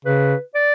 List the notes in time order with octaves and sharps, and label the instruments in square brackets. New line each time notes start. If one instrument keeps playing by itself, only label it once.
[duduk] C#3 [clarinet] B4
[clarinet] D5